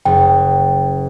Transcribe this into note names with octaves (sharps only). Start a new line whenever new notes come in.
F#1 G5